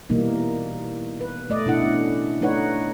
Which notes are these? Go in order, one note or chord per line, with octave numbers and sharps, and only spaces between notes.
B2 E3 G3 A#3 D#4
B4
A3 D5 D#5
B2 D4 E4 F#5
C#4
A3 D4 D#4 B4 C#5 F#5